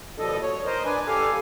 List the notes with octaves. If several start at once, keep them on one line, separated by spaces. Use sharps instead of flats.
D#2 B2 F3 G3 A4 D#5
C#5
A#4 C5 D#5
D4 B4 G#5
G4 A4 F5 G#5